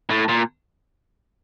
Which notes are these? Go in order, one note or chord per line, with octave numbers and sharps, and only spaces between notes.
A2
A#2